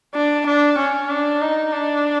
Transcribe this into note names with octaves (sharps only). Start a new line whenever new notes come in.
D4
D4
C#4
D4
D#4
D4